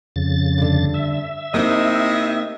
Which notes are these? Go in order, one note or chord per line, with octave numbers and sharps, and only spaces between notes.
F2 C#3 A6
G2 D3
E5
C3 A#3 C4 D#4 E4 D#5